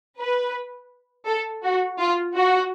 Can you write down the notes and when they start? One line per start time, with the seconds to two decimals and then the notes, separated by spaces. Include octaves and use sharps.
0.19 B4
1.26 A4
1.63 F#4
1.99 F4
2.35 F#4